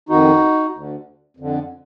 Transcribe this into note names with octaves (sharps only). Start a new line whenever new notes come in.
F2 D#3 D#4 F#4
D2 D3
F2 D3